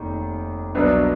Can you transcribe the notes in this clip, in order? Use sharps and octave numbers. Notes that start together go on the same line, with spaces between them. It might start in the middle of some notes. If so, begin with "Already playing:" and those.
Already playing: F1 D#2 D#3
C2 B2 F#3 B3 D4